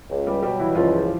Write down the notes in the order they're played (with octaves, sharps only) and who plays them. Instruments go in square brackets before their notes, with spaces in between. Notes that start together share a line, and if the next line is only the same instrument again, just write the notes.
[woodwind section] C#2
[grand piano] G3 G4
[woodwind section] B2 F#3 [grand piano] G3 G4
[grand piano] E3 E4
[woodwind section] C#2 [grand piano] F3 F4